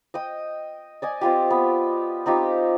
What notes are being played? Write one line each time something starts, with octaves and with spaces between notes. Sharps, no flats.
D#5 G5 D#6
D5 D#5 G#5
C4 F4 G4
B3
C4 D#4 F4 G4